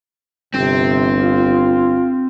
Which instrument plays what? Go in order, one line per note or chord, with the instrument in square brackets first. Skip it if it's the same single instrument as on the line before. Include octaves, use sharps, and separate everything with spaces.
[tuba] G1 [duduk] C3 [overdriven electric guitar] C4
[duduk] F4